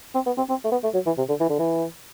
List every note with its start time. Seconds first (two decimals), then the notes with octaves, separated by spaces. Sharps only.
0.15 C4
0.27 B3
0.38 C4
0.50 C4
0.65 A3
0.72 B3
0.84 A3
0.94 F#3
1.06 E3
1.18 C3
1.29 D3
1.40 E3
1.50 D3
1.59 E3